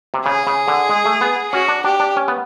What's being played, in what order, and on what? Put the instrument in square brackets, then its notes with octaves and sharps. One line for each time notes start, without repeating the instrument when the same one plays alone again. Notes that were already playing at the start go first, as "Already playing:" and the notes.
[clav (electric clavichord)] C3
[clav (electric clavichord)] C#3 [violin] G#4
[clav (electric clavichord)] C#3
D3
G#3
A3
B3
[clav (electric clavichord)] C#4 [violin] F#4
[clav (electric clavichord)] D4
[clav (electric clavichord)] D4 [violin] G4
[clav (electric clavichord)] D4
C#4
B3